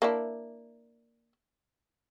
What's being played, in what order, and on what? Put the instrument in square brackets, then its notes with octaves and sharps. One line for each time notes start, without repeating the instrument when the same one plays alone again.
[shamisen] A#3 D4 E4